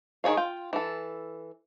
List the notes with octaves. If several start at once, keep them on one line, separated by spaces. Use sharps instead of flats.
D#3 G#4 C#5 F5
F4 G5
E3 A4